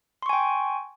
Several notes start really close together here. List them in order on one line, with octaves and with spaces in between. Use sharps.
C6 C#6 G#5 G5